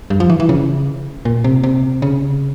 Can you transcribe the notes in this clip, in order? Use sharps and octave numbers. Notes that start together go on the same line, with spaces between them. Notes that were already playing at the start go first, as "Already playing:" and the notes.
G2
F3
E3
E3
C#3
A#2
C3
C3
C#3